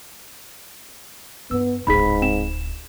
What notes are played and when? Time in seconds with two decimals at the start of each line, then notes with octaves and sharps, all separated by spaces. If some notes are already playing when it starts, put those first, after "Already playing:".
1.51 G2 B3 E4 E6
1.87 D1 G1 G#2 D#4 G#4 B5 B6
2.22 C4 E7